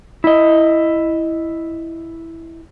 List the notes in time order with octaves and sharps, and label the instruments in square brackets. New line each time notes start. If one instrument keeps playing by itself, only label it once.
[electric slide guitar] E4 D#5